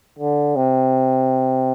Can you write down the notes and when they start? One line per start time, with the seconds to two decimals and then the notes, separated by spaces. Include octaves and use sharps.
0.19 D3
0.56 C3